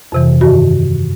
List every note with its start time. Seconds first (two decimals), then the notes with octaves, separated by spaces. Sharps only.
0.12 F2 C3 E3
0.41 G2 D#3 F#4